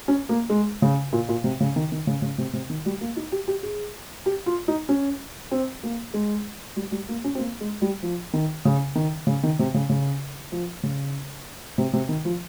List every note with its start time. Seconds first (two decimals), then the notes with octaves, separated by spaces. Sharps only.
0.08 C#4
0.29 A#3
0.50 G#3
0.82 C#3
1.13 A#2
1.29 A#2
1.44 C3
1.60 C#3
1.76 D#3
1.92 D#3
2.07 C#3
2.22 C#3
2.38 C3
2.53 C3
2.70 D#3
2.86 G3
3.01 A#3
3.16 D#4
3.32 G4
3.48 G4
3.63 G#4
4.26 G4
4.46 F4
4.68 D#4
4.89 C#4
5.51 C4
5.83 A#3
6.14 G#3
6.76 G3
6.92 G3
7.08 A#3
7.24 C#4
7.35 C4
7.39 A#3
7.61 G#3
7.82 G3
8.03 F3
8.33 D#3
8.65 C#3
8.95 D#3
9.27 C#3
9.43 D#3
9.59 C3
9.74 C#3
9.89 C#3
10.52 F3
10.83 C#3
11.78 C3
11.93 C3
12.09 D#3
12.25 F3